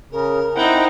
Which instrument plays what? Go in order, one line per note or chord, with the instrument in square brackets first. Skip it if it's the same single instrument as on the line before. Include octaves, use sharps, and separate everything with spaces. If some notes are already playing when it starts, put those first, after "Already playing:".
[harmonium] C#3 [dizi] A#4
[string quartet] C4 D#4 [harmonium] E4 F#5 G5